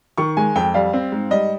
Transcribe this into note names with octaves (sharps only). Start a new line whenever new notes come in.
D#3 C#6
G#3 G#5
F2 G5
G3 F5
C4
G#2
G3 D#5